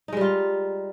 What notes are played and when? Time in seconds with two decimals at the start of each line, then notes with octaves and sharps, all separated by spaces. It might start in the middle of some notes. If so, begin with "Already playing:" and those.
0.08 D#4
0.12 G#3
0.17 G3
0.21 F4